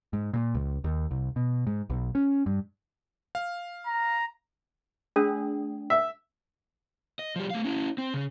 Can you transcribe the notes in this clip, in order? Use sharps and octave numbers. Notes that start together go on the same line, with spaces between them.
G#2
A#2
C#2
D#2
C2
B2
G#2
B1
C#4
G2
F5
A#5
A3 D4 G#4
E5
D#5
F3 G3
A3 F5
C#4 E4
C4
C#3